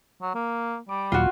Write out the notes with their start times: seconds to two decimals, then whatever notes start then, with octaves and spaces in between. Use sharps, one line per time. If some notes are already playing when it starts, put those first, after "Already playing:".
0.22 F#3
0.35 A#3
0.89 G3 D6
1.12 D#2 A#2 F#3 F4 F#4